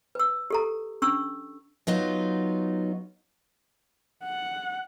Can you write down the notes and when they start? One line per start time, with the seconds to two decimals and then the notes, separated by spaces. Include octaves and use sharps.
0.15 B4 E6
0.50 G4 A4 A#5
1.02 C#4 D4 C#6 E6
1.87 F#3 B3 D#4 F4
4.24 F#5